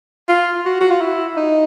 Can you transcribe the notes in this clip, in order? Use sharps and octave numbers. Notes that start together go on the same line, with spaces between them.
F4
F#4
F#4
F4
E4
D#4